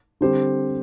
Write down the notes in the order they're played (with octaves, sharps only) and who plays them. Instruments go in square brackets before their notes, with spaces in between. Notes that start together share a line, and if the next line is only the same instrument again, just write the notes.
[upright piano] D3 G3 C4 G4 C5